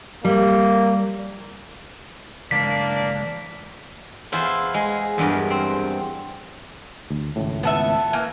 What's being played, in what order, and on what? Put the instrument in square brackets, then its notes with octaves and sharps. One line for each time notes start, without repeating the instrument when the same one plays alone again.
[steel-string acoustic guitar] G3 [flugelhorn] A#3
[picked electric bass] C#3 E3 G#3 [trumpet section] A#3 D4 D5 [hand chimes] B6
[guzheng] E2 E4 F4 C5 C6
G#3
E2 G2 A#4
C4
[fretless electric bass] D2
G#1 C#2 A2
[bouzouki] B3 A4 E5
E3 A#3